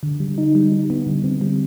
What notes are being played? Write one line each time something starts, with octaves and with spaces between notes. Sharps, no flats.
D3
G3
D#4
G3
D#4
B3
D3
C4
G3